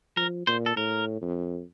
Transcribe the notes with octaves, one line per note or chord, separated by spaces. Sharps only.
F3 A#4
A#2 C5
A4
A2 A#4
F2